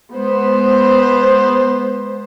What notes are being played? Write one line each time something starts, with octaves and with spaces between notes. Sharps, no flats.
G#3 B3 C5